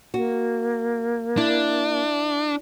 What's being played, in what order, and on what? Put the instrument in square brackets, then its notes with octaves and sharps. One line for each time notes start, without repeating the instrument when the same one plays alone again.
[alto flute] A#3 [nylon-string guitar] F#4
[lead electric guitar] D4 [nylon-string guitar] E4